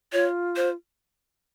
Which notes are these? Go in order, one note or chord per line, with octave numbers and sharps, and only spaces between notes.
F4 C#5
C5